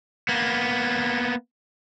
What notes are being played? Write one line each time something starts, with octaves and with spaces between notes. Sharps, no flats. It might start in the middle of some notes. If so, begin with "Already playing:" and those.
A#3 B3